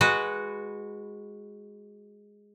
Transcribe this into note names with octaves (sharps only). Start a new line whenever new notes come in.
G#3 F#4 B4